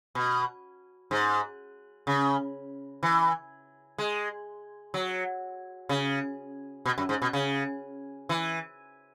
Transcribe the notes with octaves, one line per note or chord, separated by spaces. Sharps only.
B2
G#2
C#3
E3
G#3
F#3
C#3
B2
F#2
G#2
B2
C#3
E3